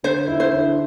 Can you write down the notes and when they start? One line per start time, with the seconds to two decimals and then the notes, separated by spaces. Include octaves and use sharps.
0.03 D3 C5
0.28 E4
0.40 C5
0.52 D3